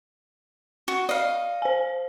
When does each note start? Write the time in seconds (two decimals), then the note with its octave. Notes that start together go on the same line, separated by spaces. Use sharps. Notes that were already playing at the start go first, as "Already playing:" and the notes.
0.88 F#4
1.09 D5 D#5 F5
1.62 C5 G#5